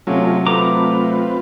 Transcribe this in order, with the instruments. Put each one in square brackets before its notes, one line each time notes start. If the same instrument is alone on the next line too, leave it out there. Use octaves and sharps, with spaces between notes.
[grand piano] C3 F#3 [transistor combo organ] A3 C#4 F4
[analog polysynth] A3 [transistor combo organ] C4 F4 B4 [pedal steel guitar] A#5 D6